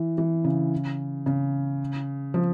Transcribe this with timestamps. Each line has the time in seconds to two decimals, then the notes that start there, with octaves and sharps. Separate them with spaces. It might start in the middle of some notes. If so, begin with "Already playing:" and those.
Already playing: E3
0.18 E3
0.44 C#3
1.26 C#3
2.34 F3